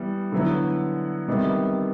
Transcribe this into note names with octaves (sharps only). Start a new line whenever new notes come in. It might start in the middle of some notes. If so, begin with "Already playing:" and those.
Already playing: E3 G3 B3
D3 F#3 B3 E4
C3 D#3 G3 B3